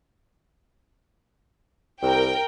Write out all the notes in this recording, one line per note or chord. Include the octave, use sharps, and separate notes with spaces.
C2 A#4 G5